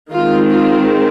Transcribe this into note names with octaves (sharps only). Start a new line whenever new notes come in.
D#3 G#3 C4 F4
F4